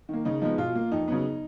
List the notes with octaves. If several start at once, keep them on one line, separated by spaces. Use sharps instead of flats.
D#3 A#3
C#3 D#4
F3 G#3 B3 D#4
B2 F4
A#3
F2 D#4
C#3 F#3 B3